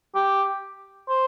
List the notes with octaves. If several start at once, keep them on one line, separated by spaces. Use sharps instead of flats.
G4
C5